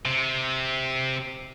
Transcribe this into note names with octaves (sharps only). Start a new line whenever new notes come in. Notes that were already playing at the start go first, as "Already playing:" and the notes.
C3